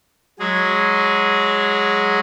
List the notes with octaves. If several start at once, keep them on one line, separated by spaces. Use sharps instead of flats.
F#3 G#3 G#4